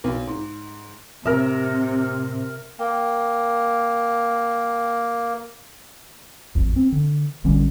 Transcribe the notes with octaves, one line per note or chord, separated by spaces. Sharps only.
B1
G#2
A2 C3 A#4 E5
A#3 G5
G#1 F2
C4
D3
A1 D3 G3 C#4